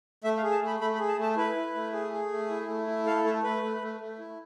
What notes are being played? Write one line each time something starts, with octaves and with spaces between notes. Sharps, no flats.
A3 E5
F5
G#4
A5
A3 B5
A3 B5
B5
G#4
A5
A3
A5
E4 B4
E4
A3
G#4
G#4
A3
E4
A3
E4
A4 F5
A3 A4
A3 B4
A3
A3
A3
E4